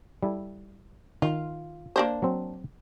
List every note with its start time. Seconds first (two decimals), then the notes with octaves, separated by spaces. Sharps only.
0.23 G3 E4 A4
1.22 D#3 F4
1.96 A#3 D4 C5
2.22 F#3 C4